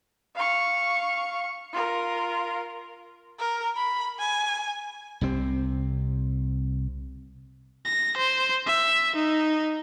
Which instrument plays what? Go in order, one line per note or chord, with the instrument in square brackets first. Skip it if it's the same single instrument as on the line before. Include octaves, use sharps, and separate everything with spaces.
[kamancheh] F5 C#6
F4 A#4
[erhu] A#4
B5
G#5
[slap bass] C2 C3 C4
[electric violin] A#6
C5
E5
D#4